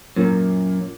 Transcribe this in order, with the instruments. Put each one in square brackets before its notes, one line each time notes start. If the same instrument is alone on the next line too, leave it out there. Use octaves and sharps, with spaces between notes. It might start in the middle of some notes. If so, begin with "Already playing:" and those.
[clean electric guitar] F#2 [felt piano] A#2 A#3